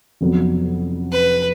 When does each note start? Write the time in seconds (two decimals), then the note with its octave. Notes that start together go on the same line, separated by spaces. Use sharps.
0.21 F1 F2 C#3 F#3 B3
1.12 B4